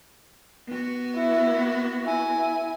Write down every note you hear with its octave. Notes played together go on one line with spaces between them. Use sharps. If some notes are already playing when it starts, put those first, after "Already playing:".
B3 F#4
E4
E4 G#5